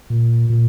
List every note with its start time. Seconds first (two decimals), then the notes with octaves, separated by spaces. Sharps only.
0.10 A#2
0.50 A#2